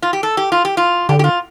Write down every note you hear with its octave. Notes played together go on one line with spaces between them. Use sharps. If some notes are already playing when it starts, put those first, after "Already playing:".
F4
G4
A4
G4
F4
G4
F4
D3 G4
G4
F4